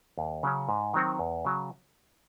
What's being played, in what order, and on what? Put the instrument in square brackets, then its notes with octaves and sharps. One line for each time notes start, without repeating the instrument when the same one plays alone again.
[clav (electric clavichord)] D#2
C#3 F#3 C#4
G#2
D#3 F#3 C4 F#4
E2
C#3 F#3